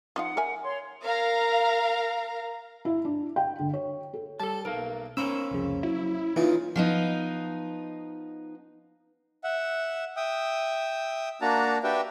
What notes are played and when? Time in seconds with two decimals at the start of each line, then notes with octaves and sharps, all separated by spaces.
0.16 F3 D#4 F4 F#5
0.37 A#4 E5 G#5
0.63 C#5 C6
1.04 A#4 F5 A#5
2.85 E4
3.05 D4
3.36 G5
3.60 D3
3.74 C#5
4.14 A4
4.40 G3 A4 A5
4.65 B1 A#4 F5
5.17 A#3 C#4 C5 C#5 B5 E6
5.51 C2 F2 C#3
5.83 F#3 E4
6.36 A#2 C#3 E3 D#4 F4
6.76 F3 B3 D#4
9.44 E5 F#5
10.17 E5 G5 D#6
11.41 A#3 D4 F#4 A5 A#5
11.84 D4 F#4 G4 B4 E5 G5